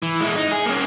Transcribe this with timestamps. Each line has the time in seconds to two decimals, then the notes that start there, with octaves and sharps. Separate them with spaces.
0.02 E3
0.21 G#3 E4
0.36 D#4
0.52 G#4
0.66 A#3 C#4